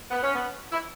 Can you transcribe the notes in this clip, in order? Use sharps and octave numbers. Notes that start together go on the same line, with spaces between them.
B3
C#4
B3
E4